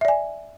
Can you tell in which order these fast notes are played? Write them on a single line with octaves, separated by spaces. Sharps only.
E5 D5 G#5